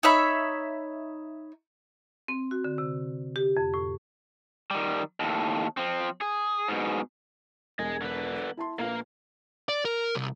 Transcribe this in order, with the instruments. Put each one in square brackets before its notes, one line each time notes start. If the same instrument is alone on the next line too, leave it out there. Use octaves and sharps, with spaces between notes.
[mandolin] D#4 C#5 E5 B5
[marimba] C4
F#4
D3
C3
G4
F2
A2
[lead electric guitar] D#3 G3
D#2 A2
F3 C4
G#4
G#2 B2
[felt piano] E1 [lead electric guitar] G#4 D#5
[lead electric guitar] D3 B4
[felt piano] E4 A5 C6
[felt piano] A#1 A#2 B4 [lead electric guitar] A#3 F5
[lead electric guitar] D5
A#4
C2